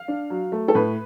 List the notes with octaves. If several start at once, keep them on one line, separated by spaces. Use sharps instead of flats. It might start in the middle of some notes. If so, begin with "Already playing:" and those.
Already playing: F5
D4
F#3
A3
A4
A2 B4